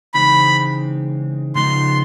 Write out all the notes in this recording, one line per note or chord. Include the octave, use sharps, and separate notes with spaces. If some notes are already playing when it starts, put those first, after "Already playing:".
C#3 E3 G#3 C4 D#4 B5
C#3 F3 G#3 B3 D#4 C6